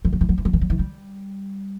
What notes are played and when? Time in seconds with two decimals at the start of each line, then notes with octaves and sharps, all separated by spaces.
0.05 E3
0.13 F#3
0.21 E3
0.29 F#3
0.38 E3
0.45 F#3
0.53 E3
0.61 F#3
0.70 E3
0.79 G3